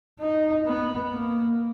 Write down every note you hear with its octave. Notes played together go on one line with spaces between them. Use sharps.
D#4
B3
A#3